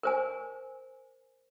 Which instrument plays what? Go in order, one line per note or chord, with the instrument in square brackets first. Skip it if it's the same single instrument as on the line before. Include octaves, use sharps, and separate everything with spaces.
[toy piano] A#4 C5 G#5